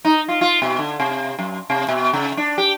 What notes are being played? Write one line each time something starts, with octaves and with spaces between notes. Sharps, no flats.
D#4
F4
F4
B2
D3
C3
F#2
C3
B2
C#3
D4
G4